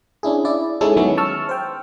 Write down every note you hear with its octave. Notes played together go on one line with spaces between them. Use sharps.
C#4 D4 E4 G#4
E4 D5
G#3 C#4 D#4 E4 G#4 A4
D#3 F#3 G#3 B3 C#4 E4
A5 C#6 E6 F6
C5 G5